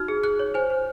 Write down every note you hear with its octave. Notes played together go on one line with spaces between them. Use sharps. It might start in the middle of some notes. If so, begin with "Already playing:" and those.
Already playing: D#4 F#4 F6
G#4
G#4 F#6
C#5
C5 G#5
C5